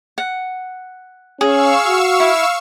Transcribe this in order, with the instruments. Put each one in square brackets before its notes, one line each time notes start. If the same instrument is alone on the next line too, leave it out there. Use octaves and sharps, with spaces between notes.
[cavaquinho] F#5
[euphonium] C#4 [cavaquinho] G#4 [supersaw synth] F5 C#6 E6
[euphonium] F#4
[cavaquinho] E4